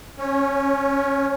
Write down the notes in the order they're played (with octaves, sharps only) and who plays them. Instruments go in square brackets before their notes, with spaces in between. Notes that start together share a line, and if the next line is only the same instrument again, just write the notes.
[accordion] C#4